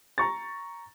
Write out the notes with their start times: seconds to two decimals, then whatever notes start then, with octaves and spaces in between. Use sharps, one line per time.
0.18 A#5 C#6 A6